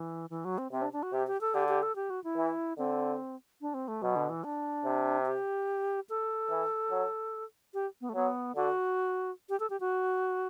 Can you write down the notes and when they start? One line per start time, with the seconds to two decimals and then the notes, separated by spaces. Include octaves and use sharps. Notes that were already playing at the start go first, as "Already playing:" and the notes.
Already playing: E3
0.30 E3
0.45 F#3
0.58 C4
0.72 C3 C4
0.82 D4
0.93 D4
1.03 F#4
1.13 C3 G4
1.27 G4
1.41 A4
1.54 D3 G4
1.68 G4
1.83 A4
1.96 G4
2.10 F#4
2.24 E4
2.37 E3
2.78 D3 C4
3.61 D4
3.74 C4
3.88 A3
4.02 B2 F#3
4.16 D3
4.29 E3
4.44 D4
4.85 C3
5.26 G4
6.09 A4
6.50 E3
6.91 F#3
7.74 G4
8.01 B3
8.09 A3
8.15 F#3 B3
8.56 D3 F#4
9.49 G4
9.60 A4
9.70 G4
9.80 F#4